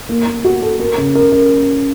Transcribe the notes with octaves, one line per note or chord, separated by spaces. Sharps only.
A#3
A#3
F#4
A4
A#4
C#3
A#4
A#4